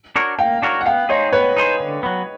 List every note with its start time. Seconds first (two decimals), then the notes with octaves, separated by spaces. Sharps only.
0.16 D4 F#4 A#4 C#5
0.38 A#3 F5 G5
0.62 D4 F#4 A#4 C#5
0.81 F#5
0.86 B3 F5 G5
1.09 D#4 G#4 C5 C#5 D#5
1.32 B3 B4 C#5
1.56 D#4 G#4 C5
1.80 D3
2.03 F#3 B3